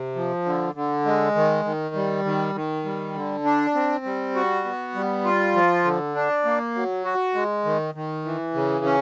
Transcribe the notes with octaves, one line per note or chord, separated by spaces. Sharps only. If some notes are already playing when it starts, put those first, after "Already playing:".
Already playing: C3
F3
D3
D3
G#3
D#3
D#3
G3
D#3
D#3
G3
D3
D4
C4
G3
F#4
B3
G3
F4
F3
D3
D4
A#3
F#3
F#4
G#3
D#3
D#3
E3
C#3
C#4